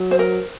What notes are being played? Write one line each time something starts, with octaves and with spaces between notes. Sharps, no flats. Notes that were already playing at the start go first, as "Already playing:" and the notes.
Already playing: F#3
C5
A#4